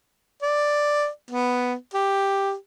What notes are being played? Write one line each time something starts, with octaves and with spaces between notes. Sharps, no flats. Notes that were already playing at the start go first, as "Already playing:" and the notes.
D5
B3
G4